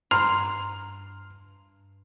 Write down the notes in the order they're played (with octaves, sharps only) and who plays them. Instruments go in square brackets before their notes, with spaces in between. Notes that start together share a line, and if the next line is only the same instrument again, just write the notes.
[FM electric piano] G2 [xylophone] A#5 [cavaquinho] C6 [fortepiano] F6